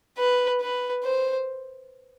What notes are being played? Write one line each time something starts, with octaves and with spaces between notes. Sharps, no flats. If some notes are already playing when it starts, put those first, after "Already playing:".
B4
B4
C5